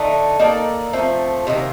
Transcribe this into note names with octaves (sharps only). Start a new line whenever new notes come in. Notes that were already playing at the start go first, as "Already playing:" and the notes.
Already playing: D3 A3 D#4
A#3 D#4 A4 D5
F3 A3 C4
C3 D#3 A#3